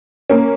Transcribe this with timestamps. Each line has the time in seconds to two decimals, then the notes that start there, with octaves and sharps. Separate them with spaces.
0.30 A#3 C#4